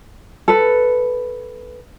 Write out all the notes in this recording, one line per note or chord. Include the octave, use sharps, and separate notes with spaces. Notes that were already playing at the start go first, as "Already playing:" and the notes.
A4 B4